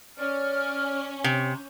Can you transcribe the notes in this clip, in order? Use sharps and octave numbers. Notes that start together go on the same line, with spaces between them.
C#4 D5 F6
C3